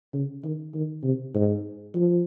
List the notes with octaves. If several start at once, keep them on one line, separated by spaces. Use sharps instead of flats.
C#3
D#3
D#3
C3
G#2
F3